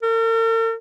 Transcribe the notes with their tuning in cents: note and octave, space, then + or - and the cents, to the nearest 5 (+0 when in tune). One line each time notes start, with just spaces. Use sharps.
A#4 -45